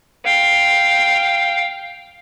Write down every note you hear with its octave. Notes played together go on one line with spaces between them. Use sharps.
F5 G5